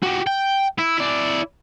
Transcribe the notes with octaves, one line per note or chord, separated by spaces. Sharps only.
F#4 G4
G5
E4
E4 D5